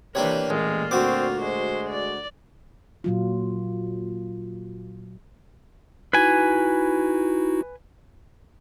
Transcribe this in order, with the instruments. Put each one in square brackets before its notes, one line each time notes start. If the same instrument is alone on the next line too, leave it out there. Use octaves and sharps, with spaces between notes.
[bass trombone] C3 [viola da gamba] E3 A#3 B4 [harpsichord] D4 G4 C#5
[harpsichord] A1 [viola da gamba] A#2 F4 [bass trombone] G#3
[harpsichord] D2 F#4 D6 [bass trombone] C4
[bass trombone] G#3 [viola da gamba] C5
[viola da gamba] D5
[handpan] A#2 F#3 F4
[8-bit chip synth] D#4 E4 F#4 [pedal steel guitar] B4 G#5